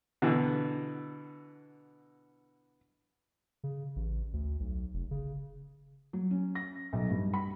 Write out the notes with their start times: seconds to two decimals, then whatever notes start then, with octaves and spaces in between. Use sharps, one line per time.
0.22 B2 D3 E3
3.64 C#3
3.96 A1
4.33 D2
4.60 B1
4.94 F1
5.11 C#3
6.13 F#3
6.31 C#4
6.55 A#6
6.93 B1
7.10 G2
7.34 B5